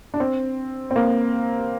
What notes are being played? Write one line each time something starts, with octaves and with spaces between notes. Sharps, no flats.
D4
C4
C4
A#3